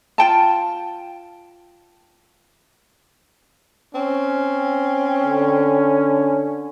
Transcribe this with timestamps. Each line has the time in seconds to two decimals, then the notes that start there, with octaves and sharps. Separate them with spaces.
0.18 F4 G5 A5
3.95 C4 C#4
5.24 D3